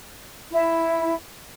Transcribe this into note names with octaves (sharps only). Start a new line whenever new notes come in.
E4